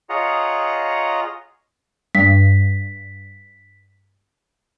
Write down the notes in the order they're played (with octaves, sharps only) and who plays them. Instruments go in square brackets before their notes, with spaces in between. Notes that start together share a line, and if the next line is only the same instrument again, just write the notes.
[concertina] F4 G#4 C#5 D#5 F#5 A#5
[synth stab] G2 [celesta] B6